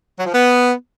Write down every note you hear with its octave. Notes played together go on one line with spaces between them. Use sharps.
F#3
F3
B3